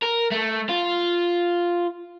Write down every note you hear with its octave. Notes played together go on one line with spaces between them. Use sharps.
A#4
A3
F4